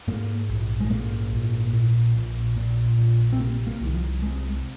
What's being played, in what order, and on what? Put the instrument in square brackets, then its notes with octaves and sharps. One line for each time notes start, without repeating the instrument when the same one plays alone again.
[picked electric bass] G#2 A#3
A#1
G#3
G#2 A#3
A#1
A#2
A#1
A#2
A#1
C4
C3 A#3
A#3
C2 D#3
F3
C3 G#3